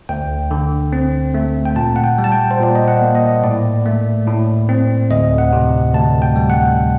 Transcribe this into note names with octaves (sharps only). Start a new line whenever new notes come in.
D2 G5
D3
C4
A3
G5
A#2 A5
F#5
G5
G3
A5
G5
C5
A#2 D5
D#5
F#5
A#3
D#5
A2 D5
A3
A2
C4
D2 D#5
F#5
C3
D2 A5
G5
G3
F#5